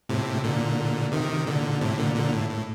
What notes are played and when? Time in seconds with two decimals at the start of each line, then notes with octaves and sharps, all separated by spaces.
0.09 A2 C3
0.44 A#2 D3
1.12 C3 D#3
1.47 A#2 D3
1.81 A2 C3
1.98 A#2 D3
2.16 A#2 D3
2.33 A2
2.50 A2